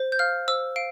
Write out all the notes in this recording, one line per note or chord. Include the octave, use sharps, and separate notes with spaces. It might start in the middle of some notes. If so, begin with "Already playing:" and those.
Already playing: C5
G6
F5 F6
C5 E6
F5 D7